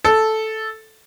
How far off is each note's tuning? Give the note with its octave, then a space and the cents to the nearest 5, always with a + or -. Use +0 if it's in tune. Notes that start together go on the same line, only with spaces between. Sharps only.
A4 -5